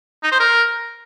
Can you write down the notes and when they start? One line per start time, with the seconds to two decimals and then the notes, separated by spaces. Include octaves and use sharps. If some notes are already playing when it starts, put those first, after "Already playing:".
0.23 D#4
0.32 C5
0.40 A#4